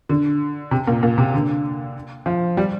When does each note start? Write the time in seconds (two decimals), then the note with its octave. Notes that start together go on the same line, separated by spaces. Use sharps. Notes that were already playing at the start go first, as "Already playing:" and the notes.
0.09 D3
0.71 C3
0.88 A#2
1.03 A#2
1.18 C3
1.34 D3
2.26 F3
2.57 G3